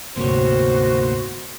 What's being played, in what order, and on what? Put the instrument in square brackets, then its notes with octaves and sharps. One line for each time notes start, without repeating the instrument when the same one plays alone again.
[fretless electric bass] D2 G#2 C3 [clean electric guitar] A#3 B3 C#5 [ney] F#4 [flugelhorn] C5